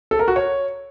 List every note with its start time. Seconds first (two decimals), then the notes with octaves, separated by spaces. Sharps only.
0.11 A4
0.19 A#4
0.28 F#4
0.36 C#5